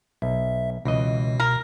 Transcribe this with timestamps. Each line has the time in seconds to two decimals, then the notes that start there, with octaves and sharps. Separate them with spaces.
0.22 B1 E5
0.85 C#2 B2 E3 D#5
1.40 A#4